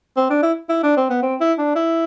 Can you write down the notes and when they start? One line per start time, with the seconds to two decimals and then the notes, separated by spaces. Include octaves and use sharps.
0.16 C4
0.30 D4
0.43 E4
0.69 E4
0.83 D4
0.97 C4
1.10 B3
1.23 C4
1.40 E4
1.58 D4
1.75 E4